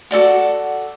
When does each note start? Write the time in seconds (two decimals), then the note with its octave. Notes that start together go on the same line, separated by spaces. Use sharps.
0.11 F#4 A4 D5 F#5